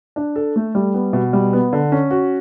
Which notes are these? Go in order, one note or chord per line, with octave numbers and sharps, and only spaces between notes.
D4
A4
A3
G3
B3
B2
G3
B3
D3
C#4
F#4